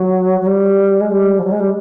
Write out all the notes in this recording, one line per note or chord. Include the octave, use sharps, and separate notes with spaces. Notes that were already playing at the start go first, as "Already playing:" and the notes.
Already playing: F#3
F#3
G3
G#3
G3
F3
F#3
G#3
G3